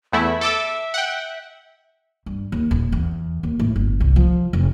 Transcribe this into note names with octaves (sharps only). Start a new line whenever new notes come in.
E2 A3 E4 E5
A4 D6 E6
F#5 G5
G2
D#2
D#1
E2
D#2
A2
G1
C2
F3
F1